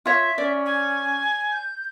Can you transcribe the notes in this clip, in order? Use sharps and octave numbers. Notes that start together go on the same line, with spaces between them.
F4 C#5 E5
C#4 D5
G#5
G6